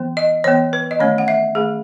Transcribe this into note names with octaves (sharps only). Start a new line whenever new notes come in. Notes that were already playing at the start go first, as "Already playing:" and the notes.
Already playing: E3 B3
D#5
E3 B3 C#5
B4
D#5
D#3 A3 C#4 C#5
F#5
E5
D#3 A3 C#4 G#4